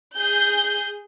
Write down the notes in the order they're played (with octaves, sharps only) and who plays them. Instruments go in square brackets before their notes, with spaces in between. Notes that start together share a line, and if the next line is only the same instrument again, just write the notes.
[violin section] G#4 G6